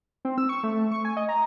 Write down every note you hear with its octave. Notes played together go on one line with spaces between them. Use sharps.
C4
E6
C#6
A3
C#6
G#5
D#5
A#5